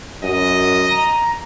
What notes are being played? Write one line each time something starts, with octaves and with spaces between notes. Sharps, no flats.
F#2 D#5
A#5